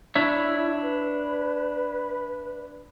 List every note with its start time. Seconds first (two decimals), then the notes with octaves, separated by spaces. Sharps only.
0.15 D4 E4 C#5 E5
0.82 B4